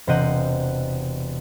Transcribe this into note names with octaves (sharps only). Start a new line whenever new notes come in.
E1 C3 C5 D#5 F#5 D#7